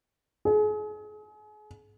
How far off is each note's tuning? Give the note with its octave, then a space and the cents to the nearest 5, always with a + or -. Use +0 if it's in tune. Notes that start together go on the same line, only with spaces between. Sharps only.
G#4 +35